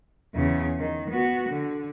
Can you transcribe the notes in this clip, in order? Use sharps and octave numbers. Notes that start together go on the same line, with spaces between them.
E2 C#3
D#3
B3 F#4
D3